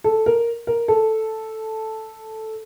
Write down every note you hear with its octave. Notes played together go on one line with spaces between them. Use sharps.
A4
A#4
A#4
A4